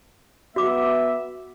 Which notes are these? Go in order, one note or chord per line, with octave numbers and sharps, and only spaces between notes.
B3 F#4 E5 D6